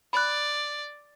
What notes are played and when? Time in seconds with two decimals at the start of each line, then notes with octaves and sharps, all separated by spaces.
0.13 D5 B5 F#6